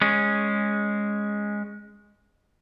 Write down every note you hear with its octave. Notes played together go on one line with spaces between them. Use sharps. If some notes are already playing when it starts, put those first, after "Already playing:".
G#3 C#4